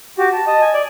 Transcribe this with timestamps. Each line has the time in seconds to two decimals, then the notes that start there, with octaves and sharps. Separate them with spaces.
0.18 F#4 G4
0.33 A5
0.47 D#5 A5
0.61 G#5
0.74 D5